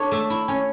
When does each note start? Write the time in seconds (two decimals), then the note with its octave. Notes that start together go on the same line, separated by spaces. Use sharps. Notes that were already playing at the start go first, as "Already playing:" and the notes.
Already playing: D4 A4 C#5
0.11 A3 E5
0.30 E4
0.48 C#4 C#5